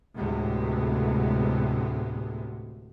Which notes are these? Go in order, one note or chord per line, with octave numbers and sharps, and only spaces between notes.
D2 A2 C3 G#3 B3